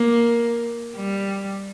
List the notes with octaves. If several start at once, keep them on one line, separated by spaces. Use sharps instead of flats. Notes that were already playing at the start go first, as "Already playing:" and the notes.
Already playing: A#3
G3